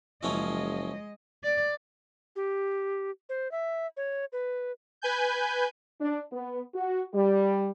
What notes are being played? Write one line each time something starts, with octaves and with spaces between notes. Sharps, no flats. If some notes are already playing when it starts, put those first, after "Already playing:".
F#1 F3 G#3 C#4 E4 D#5
D5
G4
C5
E5
C#5
B4
B4 G#5 G6
D4
B3
F#4
G3